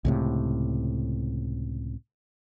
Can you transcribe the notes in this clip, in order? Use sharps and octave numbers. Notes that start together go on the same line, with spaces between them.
C#2 A2 C3